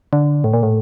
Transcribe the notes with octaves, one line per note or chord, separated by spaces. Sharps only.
D3
A2
A#2
A2